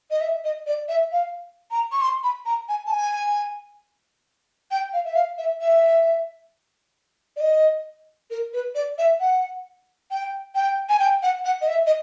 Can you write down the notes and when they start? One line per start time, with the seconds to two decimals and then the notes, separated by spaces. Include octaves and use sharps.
0.11 D#5
0.21 E5
0.44 D#5
0.67 D5
0.88 E5
1.12 F5
1.71 A#5
1.92 C#6
2.01 C6
2.23 B5
2.46 A#5
2.69 G#5
2.86 A5
2.91 G#5
4.71 G5
4.93 F5
5.05 E5
5.16 F5
5.38 E5
5.61 E5
7.36 D5
7.40 D#5
8.30 A#4
8.53 B4
8.75 D5
8.98 E5
9.20 F#5
10.11 G5
10.55 G5
10.89 G#5
10.99 G5
11.23 F#5
11.45 F#5
11.61 D#5
11.68 E5
11.86 D#5